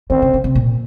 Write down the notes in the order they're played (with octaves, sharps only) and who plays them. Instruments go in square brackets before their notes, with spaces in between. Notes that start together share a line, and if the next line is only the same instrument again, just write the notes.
[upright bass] D#3 [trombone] C4
[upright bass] C#3
C#3
C3
A#2